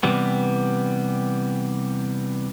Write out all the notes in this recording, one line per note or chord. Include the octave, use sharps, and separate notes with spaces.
C3 E3 G3 B3